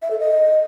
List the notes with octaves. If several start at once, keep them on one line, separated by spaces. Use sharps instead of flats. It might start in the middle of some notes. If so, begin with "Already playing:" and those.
E5
A4
D#5